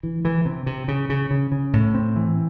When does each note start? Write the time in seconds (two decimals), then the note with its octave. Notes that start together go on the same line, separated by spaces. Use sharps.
0.03 E3
0.25 E3
0.45 C3
0.66 C3
0.88 C#3
1.10 C#3
1.31 C#3
1.52 C#3
1.73 A2
1.94 C4
2.16 E3